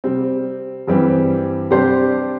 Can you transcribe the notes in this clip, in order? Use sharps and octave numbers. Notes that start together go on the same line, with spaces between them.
C3 G3 C4
G2 E3 G3 C4 G4
C3 G3 D4 G4 C5